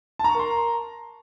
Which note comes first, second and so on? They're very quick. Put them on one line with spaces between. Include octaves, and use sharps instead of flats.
A5 A#5 C#6 A#4 C6